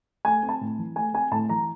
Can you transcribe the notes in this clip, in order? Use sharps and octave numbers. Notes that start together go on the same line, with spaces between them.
A3 G#5
C4
A5
A2
E3
A3 G#5
C4 G#5
A2 A5
E3 A#5